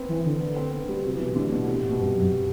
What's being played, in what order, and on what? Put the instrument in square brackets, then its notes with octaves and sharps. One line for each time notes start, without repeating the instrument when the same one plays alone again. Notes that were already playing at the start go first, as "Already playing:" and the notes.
Already playing: [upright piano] B3 C4
[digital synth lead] E3
D3
[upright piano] B3
C4
B3
G3
[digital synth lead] C3 [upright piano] F#3
[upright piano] E3
[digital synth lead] B2
[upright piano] C3
[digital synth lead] A2 [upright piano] D3
[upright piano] B2
C3
B2
[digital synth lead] G2 [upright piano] C3
[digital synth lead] F#2